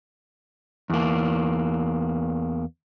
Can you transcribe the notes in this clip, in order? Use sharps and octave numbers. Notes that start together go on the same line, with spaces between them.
E2 A#3